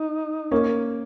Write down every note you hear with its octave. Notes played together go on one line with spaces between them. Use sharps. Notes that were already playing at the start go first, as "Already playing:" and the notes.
Already playing: D#4
A#3 C#4